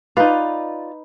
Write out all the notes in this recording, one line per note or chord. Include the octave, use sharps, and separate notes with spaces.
D#4 F4 B4 D5